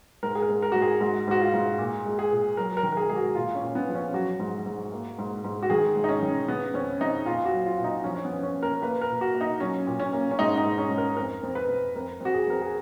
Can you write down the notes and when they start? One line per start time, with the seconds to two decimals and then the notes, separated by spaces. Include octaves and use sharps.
0.23 G#2 A#4
0.35 G#4
0.42 A#4
0.49 G#2
0.62 A#4
0.72 G#2 F#4
0.82 G#4
1.01 G#2 F#4
1.28 G#2 F#4
1.41 F4
1.54 G#2
1.79 A#2
2.05 G#3
2.19 G#4
2.31 A#2
2.57 F#3 A#4
2.77 A#4
2.83 D#3
2.92 A#4
2.97 G#4
3.10 G#2 G#4
3.16 F#4
3.35 A#2 F4
3.55 C#4
3.62 A#2
3.75 B3
3.88 F3
3.95 C#4
4.13 F#3 F#4
4.40 G#2
4.66 G#2
4.92 A#3
5.18 G#2
5.44 G#2
5.63 F#4
5.70 D#3 G#4
5.96 G#2
6.04 D#4
6.09 C#4
6.23 D#3
6.48 C#3 B3
6.74 F2 C#4
7.01 F2 D#4
7.26 A#2 F4
7.45 F#4
7.53 F#3
7.66 F4
7.78 A#2
7.84 D#4
8.04 F3 C#4
8.15 C#4
8.24 B3
8.31 F#2
8.43 C#4
8.57 A#3
8.63 A#4
8.82 A#3 B4
9.01 A#4
9.09 A#2
9.21 F#4
9.34 A#3
9.41 D#4
9.60 F#3 C#4
9.87 A#2
10.00 C#4
10.12 A#3
10.31 C#4
10.39 G#2 D#4
10.58 D#4
10.64 G#2
10.78 C#4
10.90 G#2
10.98 A#4
11.16 F2 A#4
11.43 F2
11.55 B4
11.69 F2
11.96 F2 A#4
12.20 F2 F#4
12.34 G#4
12.47 F2 A#4
12.62 G#4